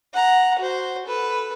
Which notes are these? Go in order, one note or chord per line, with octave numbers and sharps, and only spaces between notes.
F#5 A#5
F#4 C5
A4 B4